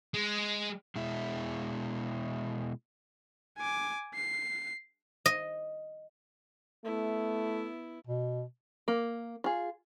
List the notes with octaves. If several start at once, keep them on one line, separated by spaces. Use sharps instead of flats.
G#3
B2 G#3 E4
G#5 D6
C7
D#5
A3 B3 E4
B2
A#3
F4 G#4